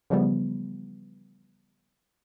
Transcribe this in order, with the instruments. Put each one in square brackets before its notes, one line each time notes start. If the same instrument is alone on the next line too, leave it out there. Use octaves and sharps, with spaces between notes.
[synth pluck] C#3 E3 F3 G3 A3 B3